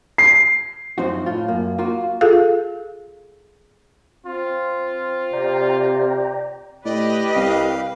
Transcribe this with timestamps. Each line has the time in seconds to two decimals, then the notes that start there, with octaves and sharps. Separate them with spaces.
0.18 C7
0.98 F#2 F3 C4 D#4 F#4
1.26 A2 F4
1.48 F#2 A#3
1.78 A#3 F4 F#4
2.21 F4 G#4 A4 F5
4.26 C4 F4
5.33 C3 D5 G5 A#5
6.85 A2 G4 B4 D5 D#5
7.36 C2 F5